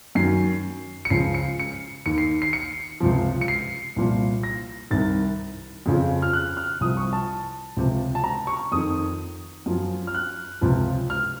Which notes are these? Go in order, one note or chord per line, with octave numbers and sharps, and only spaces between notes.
F#2 D#3 C7
C#7
C#2 C#3 F3 C7
C#7
C#7
D#2 D#3 C#7
C7
C7
C#7
C#2 C3 F3
C#7
C7
C2 A#2 F3
A#6
C2 C3 D#3 A6
F2 C#3 F3
F6
F#6
F6
C2 C3 F3 D#6
C#6
A5
C#2 C3 F3
A5
A#5
C#6
F2 D#3 D#6
F#2 F3
F6
F#6
C#2 C3 F3
F6